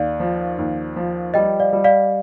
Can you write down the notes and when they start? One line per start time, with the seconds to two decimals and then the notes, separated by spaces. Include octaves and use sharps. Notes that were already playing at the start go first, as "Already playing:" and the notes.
Already playing: D#2 D5 F5
0.20 F3
0.58 D#2
0.96 F3
1.34 G3 D#5 G5
1.60 D5 F5
1.73 G3
1.84 D5 F5